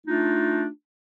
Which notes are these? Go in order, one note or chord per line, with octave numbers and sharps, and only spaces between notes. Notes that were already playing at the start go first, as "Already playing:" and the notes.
A3 D4 D#4 F4